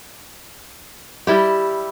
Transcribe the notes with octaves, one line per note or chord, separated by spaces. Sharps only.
G3 E4 G4